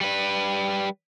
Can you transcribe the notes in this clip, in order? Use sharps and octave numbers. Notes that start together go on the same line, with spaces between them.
G3 B4